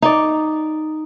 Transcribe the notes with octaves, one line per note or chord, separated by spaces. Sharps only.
D#4 D5